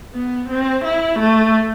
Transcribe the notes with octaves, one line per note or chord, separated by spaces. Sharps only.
B3
C4
E4
A3